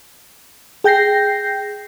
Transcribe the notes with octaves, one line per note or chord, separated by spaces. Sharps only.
G#4 G5 G6 A#6 C7